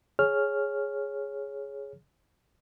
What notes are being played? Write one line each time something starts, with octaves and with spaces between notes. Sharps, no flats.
G#4 C#5 F6